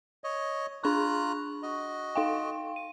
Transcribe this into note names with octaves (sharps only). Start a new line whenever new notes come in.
C#5 D#5
D4 F4 A#5 C#6 F#6
F#4 D#5
D#4 F5 G5
D#7